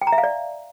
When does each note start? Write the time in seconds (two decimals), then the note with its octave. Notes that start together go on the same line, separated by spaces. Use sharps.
0.02 G5
0.07 A#5
0.12 E5
0.18 F5
0.23 D5